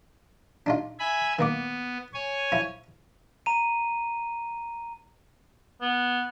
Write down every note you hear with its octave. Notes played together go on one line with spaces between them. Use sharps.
D4 D#4 F4
E5 G#5 B5
D#3 A#3 B3 D6
C#5 G#5
F3 E4
A#5 D#7
B3